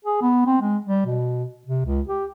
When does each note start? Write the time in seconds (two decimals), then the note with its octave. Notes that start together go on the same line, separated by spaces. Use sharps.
0.05 G#4
0.22 B3
0.47 C4
0.62 G#3
0.86 G3
1.06 B2
1.67 C3
1.85 C#2
2.09 G4